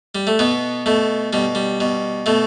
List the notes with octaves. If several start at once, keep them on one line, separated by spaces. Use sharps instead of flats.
G3
A3
B2 B3
B2 A3
B2 G3
G3
B2
B2 A3